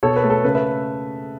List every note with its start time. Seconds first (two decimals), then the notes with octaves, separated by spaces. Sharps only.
0.03 B2 A4 C#5
0.16 B4
0.24 A3
0.30 A4
0.44 C#3 B4
0.55 B4 E5